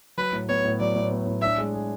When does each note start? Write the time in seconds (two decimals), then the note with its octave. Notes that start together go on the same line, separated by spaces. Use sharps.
0.18 F#3 B4
0.33 A2
0.49 B3 C#5
0.65 A2
0.80 F#3 D5
0.96 A2
1.11 B3
1.27 A2
1.42 D4 E5
1.58 G#3
1.74 G#4